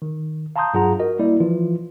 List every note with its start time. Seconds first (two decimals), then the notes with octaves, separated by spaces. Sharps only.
0.02 D#3
0.56 F5 A5 A#5 C6 D#6 G6
0.74 G2 F#3 F4 G#4 F#5 A#5
0.99 F#4 A#4 D#5
1.19 G3 A#3 E4 D5
1.40 E3 F3 F4